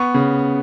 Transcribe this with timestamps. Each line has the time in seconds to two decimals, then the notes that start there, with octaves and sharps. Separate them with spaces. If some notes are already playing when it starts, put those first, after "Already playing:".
Already playing: B3 C#6
0.14 C#3